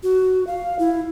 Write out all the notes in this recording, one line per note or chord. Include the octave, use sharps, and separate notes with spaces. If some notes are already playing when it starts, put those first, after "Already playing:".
F#4
F5
E4